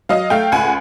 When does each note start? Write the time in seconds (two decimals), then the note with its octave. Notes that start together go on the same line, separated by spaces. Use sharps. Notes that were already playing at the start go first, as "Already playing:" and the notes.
0.09 F#3 D#5 F5
0.30 A3 F5 G5
0.52 C#2 F#5 G#5